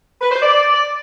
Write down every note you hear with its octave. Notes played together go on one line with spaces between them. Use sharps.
B4
C5
D5